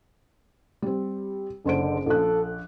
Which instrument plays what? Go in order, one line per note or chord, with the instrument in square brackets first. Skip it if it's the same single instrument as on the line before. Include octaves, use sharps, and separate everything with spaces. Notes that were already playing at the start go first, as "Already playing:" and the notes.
[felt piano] G3 C4
[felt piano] F#1 C5 D7 [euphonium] D3
[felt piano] A#1 F3 F#6 [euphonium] A4